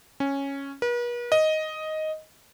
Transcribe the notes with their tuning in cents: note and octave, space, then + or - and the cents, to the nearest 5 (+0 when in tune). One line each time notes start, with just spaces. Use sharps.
C#4 -5
B4 -45
D#5 +5